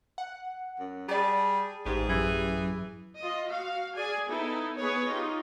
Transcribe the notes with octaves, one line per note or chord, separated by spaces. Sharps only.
F#5
F#2
G3 G#4 D5 A5
A1 G#2 G4 G#4
F#2 E3
F4 D#5
F#4 F5
G#4 D5 G#5
B3 D#4 E4 A4
B3 G#4 B4 C#5
D#4 F4 G4